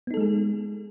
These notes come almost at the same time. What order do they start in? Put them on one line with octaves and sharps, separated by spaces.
B3 D#4 A4 G#3 G#4